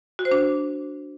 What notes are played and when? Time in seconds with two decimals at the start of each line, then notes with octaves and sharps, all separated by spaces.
0.19 F#4
0.25 C5
0.31 D4